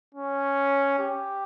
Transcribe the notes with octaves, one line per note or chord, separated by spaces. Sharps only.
C#4
G4